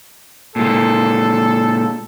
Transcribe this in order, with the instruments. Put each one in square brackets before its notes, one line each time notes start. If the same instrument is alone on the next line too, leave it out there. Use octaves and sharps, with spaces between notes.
[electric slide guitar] A#2 G#3 [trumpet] A4